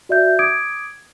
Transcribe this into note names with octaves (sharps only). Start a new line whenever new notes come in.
F#4 D5 E5 G6
D6 D#6 G#6 D7